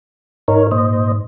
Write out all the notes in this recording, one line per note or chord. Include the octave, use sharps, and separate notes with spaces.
G#2 D#4 A#4 C#5
A#2 C5 D#5